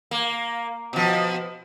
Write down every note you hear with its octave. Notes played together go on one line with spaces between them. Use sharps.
A#3
B2 F3